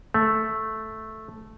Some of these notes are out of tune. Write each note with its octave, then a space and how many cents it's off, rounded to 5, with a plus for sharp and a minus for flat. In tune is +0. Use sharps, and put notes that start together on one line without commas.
A3 -5